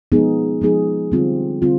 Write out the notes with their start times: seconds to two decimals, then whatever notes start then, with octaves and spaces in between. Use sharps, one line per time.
0.12 F3 G#3 B3 D#4 G#4
0.61 F3 G#3 B3 D#4 G#4
1.12 D3 G3 C4 F4
1.62 D3 G3 C4 F4